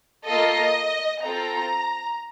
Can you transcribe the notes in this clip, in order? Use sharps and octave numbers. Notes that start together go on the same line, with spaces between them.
A#3 F4 A4 D#5
C4 F4 A4 A#5